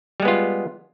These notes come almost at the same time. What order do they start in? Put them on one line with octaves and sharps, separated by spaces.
G3 G#3 B3 F4